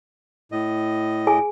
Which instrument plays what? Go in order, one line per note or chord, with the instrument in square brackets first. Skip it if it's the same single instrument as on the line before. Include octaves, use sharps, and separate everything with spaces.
[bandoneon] A2 D#5
[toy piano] G#4 G#5